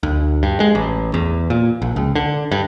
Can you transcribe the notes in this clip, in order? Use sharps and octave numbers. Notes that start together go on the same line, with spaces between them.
D2
G2
G#3
A1
E2
A#2
A#1
C#2
D3
G2